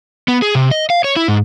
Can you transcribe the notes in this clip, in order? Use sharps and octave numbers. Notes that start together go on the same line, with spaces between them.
B3
G#4
C3
D#5
F5
C#5
E4
G#2